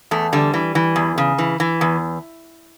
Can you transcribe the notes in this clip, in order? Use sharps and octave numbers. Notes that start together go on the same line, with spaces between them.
E2 A3
D3 G3
E3
E3
E2
C#3
E3
E3
E2